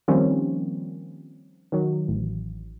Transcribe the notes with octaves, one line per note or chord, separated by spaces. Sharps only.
D#3 F3 G3 A#3 C4 C#4
D#3 F#3
A1